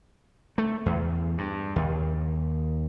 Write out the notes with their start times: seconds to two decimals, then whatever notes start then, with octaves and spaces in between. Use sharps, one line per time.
0.58 A3
0.86 E2
1.38 G2
1.76 D#2